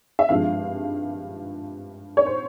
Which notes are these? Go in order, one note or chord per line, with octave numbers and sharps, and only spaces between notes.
E5
G#1 G2 F3 G#3 F5
C#5
C5